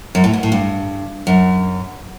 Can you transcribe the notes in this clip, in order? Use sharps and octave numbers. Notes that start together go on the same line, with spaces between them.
F#2
A2
B2
A2
G2
F#2